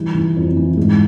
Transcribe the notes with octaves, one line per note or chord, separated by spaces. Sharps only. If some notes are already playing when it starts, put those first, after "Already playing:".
Already playing: E3 G3 D#4 F4
E3
F2
E3
G#2